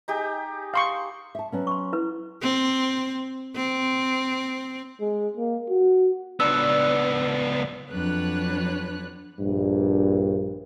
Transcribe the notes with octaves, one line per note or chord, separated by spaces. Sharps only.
D#4 G4 G#4
F5 C6 C#6
E5 A5
F#3 B3 C#4
C6 C#6
E4 B4
C4
C4
G#3
A#3
F#4
C#2 B3 D4 E6
F2 F#3 D4 B4 C#5 F#6
A#1 G2